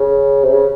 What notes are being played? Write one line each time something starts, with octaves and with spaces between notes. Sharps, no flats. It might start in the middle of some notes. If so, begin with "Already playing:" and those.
Already playing: C#3
C3
C#3